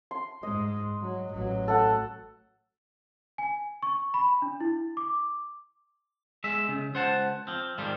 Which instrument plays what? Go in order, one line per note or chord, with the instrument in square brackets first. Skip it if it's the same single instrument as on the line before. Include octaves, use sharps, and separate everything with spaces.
[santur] C6
[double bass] G#2 G#3 [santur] D#5
[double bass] F#3
A1 F#3
[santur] A4 F#5
[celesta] G#5
C#6
B5
D4
E4
D6
[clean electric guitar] G#3 E5
C#3
C#2 C5 F#5 A5
F3 C4
G#2 D#3 F3 G3